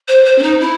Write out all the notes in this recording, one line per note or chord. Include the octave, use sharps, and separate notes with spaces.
C5
C5
C#4
D#4
E4